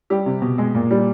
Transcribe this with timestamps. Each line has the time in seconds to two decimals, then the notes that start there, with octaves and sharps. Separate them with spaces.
0.10 G3 G4
0.26 C3
0.41 B2
0.58 G#3
0.74 A#2
0.91 G3